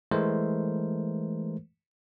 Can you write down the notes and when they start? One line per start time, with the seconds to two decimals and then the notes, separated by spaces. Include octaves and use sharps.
0.12 E3 G#3 A3 A#4 C5